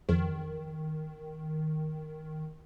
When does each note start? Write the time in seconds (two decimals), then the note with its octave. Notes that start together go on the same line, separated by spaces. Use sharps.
0.09 F2 D#3